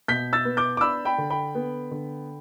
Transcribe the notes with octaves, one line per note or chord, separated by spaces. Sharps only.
B2 G6 B6
E6 A6
B3
D6 G6
D6
D4 B5 E6
G5 B5
D3
G5 B5
B3
D3